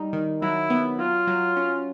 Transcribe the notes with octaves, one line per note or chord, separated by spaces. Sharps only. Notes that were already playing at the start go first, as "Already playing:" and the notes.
Already playing: G3 D#4
D#3
F#3 E4
B3
F#3 F4
F#3
C#4